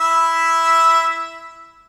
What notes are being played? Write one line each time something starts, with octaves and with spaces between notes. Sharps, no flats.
E4 E5